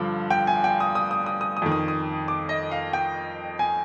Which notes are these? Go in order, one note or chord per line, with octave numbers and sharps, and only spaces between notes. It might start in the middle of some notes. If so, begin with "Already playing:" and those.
Already playing: G2 D3 F3
G5
G#5
G5
D#6
D#6
D#6
D#6
D#6
D#6
F2 D#3
D#6
D#6
D6
D#5
F5
G5
G#5